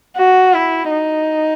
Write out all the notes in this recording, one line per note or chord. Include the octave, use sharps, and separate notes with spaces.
F#4
E4
D#4